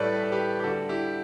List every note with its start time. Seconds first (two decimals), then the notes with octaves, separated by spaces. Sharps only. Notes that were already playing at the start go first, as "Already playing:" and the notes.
Already playing: A2 G3 A4 B4 C#5 D5
0.14 B4
0.24 A4
0.32 G4 B4
0.60 G4
0.64 D3 G3 F#4 A4
0.89 E4 G4